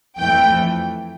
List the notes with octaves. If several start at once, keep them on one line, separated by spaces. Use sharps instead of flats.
F2 E3 A3 G5